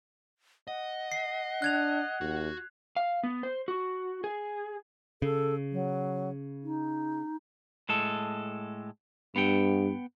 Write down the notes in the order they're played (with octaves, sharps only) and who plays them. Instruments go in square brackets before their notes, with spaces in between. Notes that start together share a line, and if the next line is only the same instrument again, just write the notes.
[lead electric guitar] D#5 [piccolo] F#5
[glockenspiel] C7
[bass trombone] D4 [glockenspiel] F#6 G#6 F7
[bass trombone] D#2 [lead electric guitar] F#4
[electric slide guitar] F5
B3
C5
F#4
G#4
[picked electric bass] C#3 [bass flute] A4
[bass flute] F#3
D#4
[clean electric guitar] A2 G#3 A4
[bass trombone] G2 [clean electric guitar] B3 F#5 G5